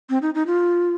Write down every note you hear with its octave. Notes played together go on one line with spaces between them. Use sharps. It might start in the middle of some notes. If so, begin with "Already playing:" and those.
C4
D#4
D#4
F4